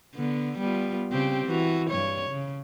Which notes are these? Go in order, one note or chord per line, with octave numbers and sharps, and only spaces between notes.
D3 B3
G3 B3 F4
C#3 C4 G4
E3 F#4
G2 C#5
C#3